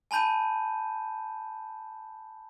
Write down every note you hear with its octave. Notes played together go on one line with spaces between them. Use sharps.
G#5 A5 B5 G6 D#7